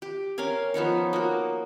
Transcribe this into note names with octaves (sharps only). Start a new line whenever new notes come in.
G4
C#4 A#4 F5 G#5
F3 B3 D#4 C#5
A#3 F#4